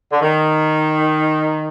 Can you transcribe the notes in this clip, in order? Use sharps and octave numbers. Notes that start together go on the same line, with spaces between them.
D3
D#3